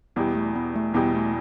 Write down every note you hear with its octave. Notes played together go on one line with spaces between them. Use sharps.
E2 B2 G3 B3 E4 G4
A3
B3
A3
E2 B2 G3 B3 E4 G4
A3